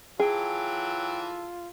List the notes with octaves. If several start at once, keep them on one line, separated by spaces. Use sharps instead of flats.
E3 F#3 F4 G#4 A4 G5